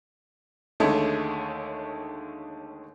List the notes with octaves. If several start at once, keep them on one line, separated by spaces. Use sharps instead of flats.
D#2 D3 G#3 A3 C#4 C#5